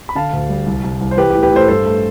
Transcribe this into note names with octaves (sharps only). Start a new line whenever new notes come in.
B5
D3 F5 A5
D2
G3
C2
C2
C2
C5
E3 G4 B4
G4
A2
G4 B4
A2 A4 C5
G2 A4 C5
A3